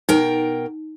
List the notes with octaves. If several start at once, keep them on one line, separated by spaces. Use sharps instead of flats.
B2 D#4 A#4 G5